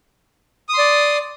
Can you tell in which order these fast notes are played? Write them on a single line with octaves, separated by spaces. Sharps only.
D#6 C6 D5